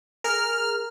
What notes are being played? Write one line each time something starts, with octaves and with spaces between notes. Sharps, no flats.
G#4 A#4 F6